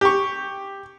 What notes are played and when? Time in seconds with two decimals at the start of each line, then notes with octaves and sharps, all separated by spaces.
0.01 G4 C#6